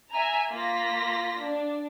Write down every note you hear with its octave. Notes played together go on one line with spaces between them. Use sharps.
E5 G#5 A#5
A#3 F4 A#6 B6
D4